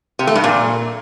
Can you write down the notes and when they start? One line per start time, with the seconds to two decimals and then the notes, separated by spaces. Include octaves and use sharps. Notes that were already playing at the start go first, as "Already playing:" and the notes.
0.19 C3
0.27 A3
0.35 G2
0.44 A#2